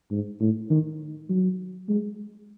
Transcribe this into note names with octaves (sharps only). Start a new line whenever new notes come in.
G#2
A2
D#3
F#3
G#3